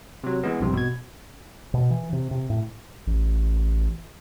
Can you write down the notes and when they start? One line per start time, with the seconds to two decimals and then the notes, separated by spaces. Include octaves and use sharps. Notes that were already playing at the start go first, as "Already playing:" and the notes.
0.24 C3 F#3
0.43 E3 G#3 B3
0.60 A#1 G2 C3
0.73 B2 G#6
1.74 B2
1.90 E3
2.13 C3
2.31 C3
2.50 A2
3.07 A1